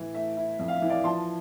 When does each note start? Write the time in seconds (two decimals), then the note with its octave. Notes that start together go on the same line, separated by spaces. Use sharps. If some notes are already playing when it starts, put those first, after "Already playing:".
Already playing: A2 E3
0.14 A3 E5
0.37 E4
0.59 F2
0.68 F5
0.74 E5
0.82 E3
0.90 D5 F5
1.04 F3 A5 C6